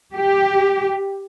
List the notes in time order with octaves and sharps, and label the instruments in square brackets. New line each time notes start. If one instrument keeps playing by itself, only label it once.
[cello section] G4